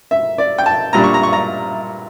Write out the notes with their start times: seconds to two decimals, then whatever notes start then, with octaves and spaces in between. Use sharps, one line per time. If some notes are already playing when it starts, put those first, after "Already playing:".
0.11 E5
0.38 D5
0.58 G5
0.66 A5
0.93 A#2 G3 D4 A#5
1.04 C#6
1.14 A#5
1.23 C#6
1.33 A#5